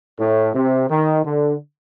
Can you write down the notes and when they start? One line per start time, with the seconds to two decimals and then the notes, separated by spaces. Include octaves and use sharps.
0.18 A2
0.54 C3
0.88 D#3
1.24 D3